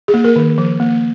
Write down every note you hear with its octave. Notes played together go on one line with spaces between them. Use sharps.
G#4
A#3
A#4
D#3
F3
A#3